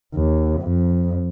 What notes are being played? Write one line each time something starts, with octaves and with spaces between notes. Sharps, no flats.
D#2
F2